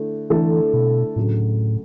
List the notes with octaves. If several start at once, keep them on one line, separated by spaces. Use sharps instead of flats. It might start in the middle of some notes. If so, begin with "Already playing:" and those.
Already playing: D3 A3 E4
D3 E3 A3 E4 A4
B2
D2 A2 C#3 F#3